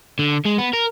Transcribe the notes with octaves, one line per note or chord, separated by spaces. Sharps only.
D3
G#3
B3
A#4